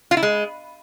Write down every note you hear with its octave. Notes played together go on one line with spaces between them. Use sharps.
F4
E4
G#3